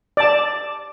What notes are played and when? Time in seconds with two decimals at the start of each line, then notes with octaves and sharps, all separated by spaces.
0.17 D5 A5